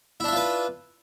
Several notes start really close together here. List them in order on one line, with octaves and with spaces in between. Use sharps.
E4 D4 E5 F4 B4